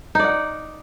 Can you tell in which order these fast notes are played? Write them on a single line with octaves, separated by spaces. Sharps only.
D#4 D5 F#5